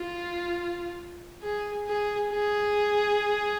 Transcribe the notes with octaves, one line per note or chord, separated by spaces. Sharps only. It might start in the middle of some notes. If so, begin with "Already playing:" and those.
Already playing: F4
G#4
G#4
G#4